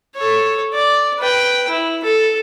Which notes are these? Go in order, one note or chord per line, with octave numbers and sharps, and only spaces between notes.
A4 C#5
D5
B4 G5
E4
A4